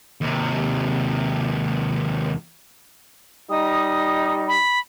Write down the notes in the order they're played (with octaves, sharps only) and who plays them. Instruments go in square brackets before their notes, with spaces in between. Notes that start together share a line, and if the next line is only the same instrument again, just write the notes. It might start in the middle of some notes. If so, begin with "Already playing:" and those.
[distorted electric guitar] D#2 C3
[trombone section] G3 D#4 [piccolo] D#6
[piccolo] B5